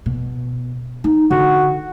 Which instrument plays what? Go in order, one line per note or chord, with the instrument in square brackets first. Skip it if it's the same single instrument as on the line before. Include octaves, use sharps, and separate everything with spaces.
[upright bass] B2
D#4
[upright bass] D3 [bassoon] F#4